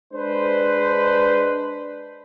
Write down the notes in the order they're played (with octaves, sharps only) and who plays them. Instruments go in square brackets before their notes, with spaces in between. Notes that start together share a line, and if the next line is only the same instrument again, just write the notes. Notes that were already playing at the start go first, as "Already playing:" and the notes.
[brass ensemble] G#3 D4 B4 C5